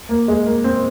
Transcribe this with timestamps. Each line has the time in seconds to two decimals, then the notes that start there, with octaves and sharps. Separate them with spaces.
0.09 A#3
0.28 G#3
0.46 A#3
0.64 C4